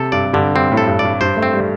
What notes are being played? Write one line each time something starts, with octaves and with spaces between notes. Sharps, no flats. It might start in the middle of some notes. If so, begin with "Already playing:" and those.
Already playing: C3 A4
G2 D5
G2 D3
G2 C4
A2
A4
G2
D5
G2
G2 C5
A3
C4
G3